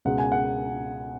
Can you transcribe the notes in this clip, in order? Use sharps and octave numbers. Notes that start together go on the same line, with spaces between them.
C#2 B2 G#3 F#5
G#5
F#5